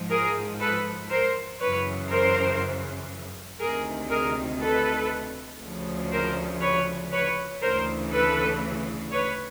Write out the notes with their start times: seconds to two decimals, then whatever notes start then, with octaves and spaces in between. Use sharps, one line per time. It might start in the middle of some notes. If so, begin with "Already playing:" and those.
Already playing: G#2 F3
0.09 G#4 A#4
0.59 A4 B4
1.10 A#4 C5
1.60 F#2 C#3 E3 B4 C#5
2.10 A#4 C5
3.60 D2 C3 D#3 G#4 A#4
4.10 G#4 A#4
4.60 A4 B4
5.60 D2 C#3 F3
6.11 A#4 C5
6.60 B4 C#5
7.11 B4 C#5
7.61 D2 C#3 E3 A#4 C5
8.12 A4 B4
9.11 B4 C#5